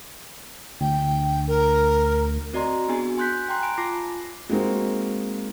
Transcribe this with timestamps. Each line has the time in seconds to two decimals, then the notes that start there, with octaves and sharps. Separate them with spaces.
0.81 D2 G5
1.48 A#4
2.53 C4 F#4 D5 D#5 A#5 C6
2.88 B3 D4 F#4 G#4 G#5
3.17 G#5 C6 F#6 G6 B6
3.49 G5 A#5 C6 F#6
3.63 G#5 A#5 B5 D7
3.78 F4 A5 D6 A#6 C7
4.49 G#3 A#3 C4 D#4 F#4